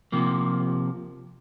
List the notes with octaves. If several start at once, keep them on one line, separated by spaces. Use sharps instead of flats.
C3 F3 A#3